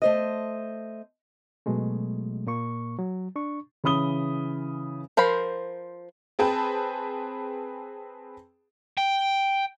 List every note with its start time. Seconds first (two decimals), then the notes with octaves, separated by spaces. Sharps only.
0.02 A3 C5 D#5
1.66 B2 F#3 G#3 A3
2.47 A#2 A#3 C#6
2.99 F#3
3.36 D4 C#6
3.84 C#3 E3 B5 D#6 G7
5.17 F3 A#4 C5 B5
6.39 C4 G#4 B4 G5 A5 B5
8.98 G5